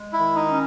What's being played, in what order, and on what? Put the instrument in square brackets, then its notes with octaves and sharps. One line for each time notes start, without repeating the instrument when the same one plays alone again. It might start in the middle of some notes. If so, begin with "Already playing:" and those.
Already playing: [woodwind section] G#3
[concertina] E4
[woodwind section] D#3
[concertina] D#4
[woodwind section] C#4